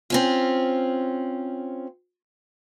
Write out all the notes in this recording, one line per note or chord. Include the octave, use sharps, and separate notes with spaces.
C4 C#4 F4